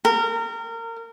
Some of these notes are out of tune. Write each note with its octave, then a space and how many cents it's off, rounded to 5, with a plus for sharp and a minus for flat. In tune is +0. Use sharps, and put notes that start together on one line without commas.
A#4 -25